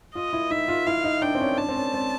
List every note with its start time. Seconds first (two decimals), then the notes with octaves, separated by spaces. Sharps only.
0.15 F4 D#5
0.33 E4
0.51 D#4 E5
0.68 F4
0.87 E4 F5
1.04 D#4
1.22 D4 G5
1.35 C4
1.40 C#4
1.58 D4 A5
1.68 C4
1.76 C#4
1.94 C4